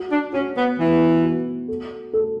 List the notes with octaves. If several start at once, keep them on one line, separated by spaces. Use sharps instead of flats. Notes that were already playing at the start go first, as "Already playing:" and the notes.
Already playing: F#4
D4
C#4 F#4
B3
E3 B3
F#4
A4
A4